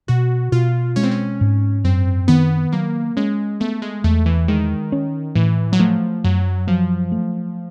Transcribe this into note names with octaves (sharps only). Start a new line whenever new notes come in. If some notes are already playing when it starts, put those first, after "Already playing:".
B2 F#4
B2 F4
G#3 C#4
C4
C#4
G#2
F#2 C4
D#3 B3
F#3 A#3
G#3 C#4
A3 B3
G#3
E2 A3
E3
D#3 G#3
C#4
A2 E3
F#3
F3 A3
F#2 F#3
F3 F#3
A3